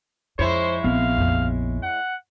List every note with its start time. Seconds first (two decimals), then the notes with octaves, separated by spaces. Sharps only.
0.39 F2 G#3 E4 C5 C#5
0.84 A#1 B3 C4 F5
1.18 F2
1.83 F#5